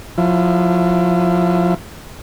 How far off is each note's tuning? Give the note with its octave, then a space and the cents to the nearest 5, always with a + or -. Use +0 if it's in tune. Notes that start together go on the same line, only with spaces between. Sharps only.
F3 +30 E4 +35